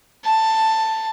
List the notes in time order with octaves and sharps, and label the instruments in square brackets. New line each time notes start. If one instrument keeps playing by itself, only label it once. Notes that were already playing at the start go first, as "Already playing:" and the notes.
[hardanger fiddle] A5